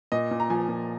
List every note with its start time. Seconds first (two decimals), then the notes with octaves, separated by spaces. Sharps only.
0.12 A#2 D#5
0.31 A#2
0.40 A#5
0.50 F3 G#5
0.69 A#2